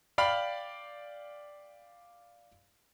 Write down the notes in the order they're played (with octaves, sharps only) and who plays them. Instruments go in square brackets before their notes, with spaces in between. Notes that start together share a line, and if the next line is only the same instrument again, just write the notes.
[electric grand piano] D5 F5 G5 B5 F6